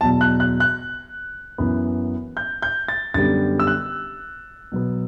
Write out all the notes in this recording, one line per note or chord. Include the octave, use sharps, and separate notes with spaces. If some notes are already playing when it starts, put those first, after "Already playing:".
E2 B2 F#3 A5
F#6
F#6
F#6
F#2 E3 B3
G6
G6
A6
F#2 D3 G3 B3 A6
E6
F#6
B2 F#3 B3